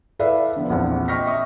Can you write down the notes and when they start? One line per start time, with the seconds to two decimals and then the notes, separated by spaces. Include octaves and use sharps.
0.19 E4 A4 B4 D5 E5 F5
0.56 D3 F3 B3
0.70 A#1 E2 C4 F#5
1.08 D#5 G5 C#6 F6 A#6 B6
1.26 E5 C#6 D#6